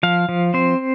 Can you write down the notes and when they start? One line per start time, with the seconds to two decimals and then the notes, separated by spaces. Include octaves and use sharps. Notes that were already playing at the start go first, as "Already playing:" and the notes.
0.03 F3 F5
0.29 F3
0.54 C4 C5